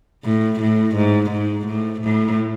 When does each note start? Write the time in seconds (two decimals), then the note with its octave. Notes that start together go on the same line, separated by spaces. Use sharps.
0.24 A2
0.61 A2
0.96 G#2
1.31 G#2
1.67 A2
2.02 A2